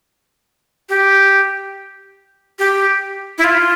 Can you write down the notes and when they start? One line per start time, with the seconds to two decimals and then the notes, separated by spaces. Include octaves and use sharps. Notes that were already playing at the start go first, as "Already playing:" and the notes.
0.89 G4
2.59 G4
3.38 E4
3.44 F4